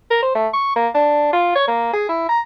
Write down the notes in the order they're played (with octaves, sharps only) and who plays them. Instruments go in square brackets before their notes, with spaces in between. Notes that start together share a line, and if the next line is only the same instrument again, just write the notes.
[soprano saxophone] A#4
C5
A3
C#6
A#3
D4
F4
C#5
A#3
G#4
E4
A#5